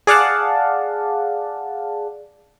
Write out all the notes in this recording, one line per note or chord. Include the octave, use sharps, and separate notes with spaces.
G#4 D5 F5 F#5 A5